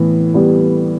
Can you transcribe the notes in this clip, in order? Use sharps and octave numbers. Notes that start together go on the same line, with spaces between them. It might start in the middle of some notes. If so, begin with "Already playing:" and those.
Already playing: A2 E3 B3
G3 B3